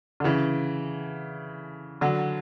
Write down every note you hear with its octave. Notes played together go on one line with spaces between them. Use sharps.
D3
C#3 E3
D3 F#3